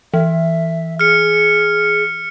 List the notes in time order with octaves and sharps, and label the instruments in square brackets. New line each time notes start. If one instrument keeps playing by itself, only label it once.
[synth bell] E3 [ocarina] E5
[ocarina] G#4 [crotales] F6 C#7